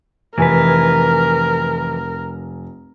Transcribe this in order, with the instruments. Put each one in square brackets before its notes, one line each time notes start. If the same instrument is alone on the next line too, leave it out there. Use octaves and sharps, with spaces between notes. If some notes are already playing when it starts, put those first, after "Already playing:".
[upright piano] F1 G#5 [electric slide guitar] E3 B4 [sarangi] A#4